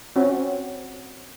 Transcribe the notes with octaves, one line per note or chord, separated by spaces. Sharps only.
C4 C#4 F#4